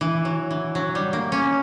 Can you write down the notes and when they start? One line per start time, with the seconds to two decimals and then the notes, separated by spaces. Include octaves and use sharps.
0.01 E3
0.25 F#3
0.51 E3
0.75 F#3
0.95 G3
1.13 A#3
1.32 C#4